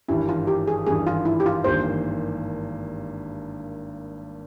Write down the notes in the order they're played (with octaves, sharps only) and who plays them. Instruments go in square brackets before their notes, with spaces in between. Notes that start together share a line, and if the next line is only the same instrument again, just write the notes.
[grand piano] G#1 G2 E3 G3 [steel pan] E4
[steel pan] F4
G4
G#4
[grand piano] G#1 G2 E3 G3 [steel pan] G#4
[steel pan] F4
E4
G4
F4
[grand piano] G#1 G2 E3 A#3 [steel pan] C5